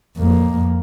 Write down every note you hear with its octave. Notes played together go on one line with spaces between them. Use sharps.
F2 A#3